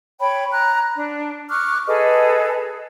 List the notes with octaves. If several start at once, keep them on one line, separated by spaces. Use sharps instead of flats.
C#5 G5 B5
A#5 F#6
D4
C#6 D6 F6 F#6
G#4 A4 B4 D#5